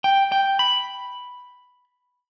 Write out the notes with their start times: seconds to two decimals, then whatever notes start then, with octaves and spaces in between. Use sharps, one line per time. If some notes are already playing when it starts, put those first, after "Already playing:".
0.04 G5
0.32 G5
0.59 B5